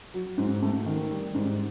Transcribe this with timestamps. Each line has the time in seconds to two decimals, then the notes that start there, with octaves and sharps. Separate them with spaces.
0.14 F#3
0.38 G#2
0.62 A3
0.86 D#3
1.11 G3
1.35 G#2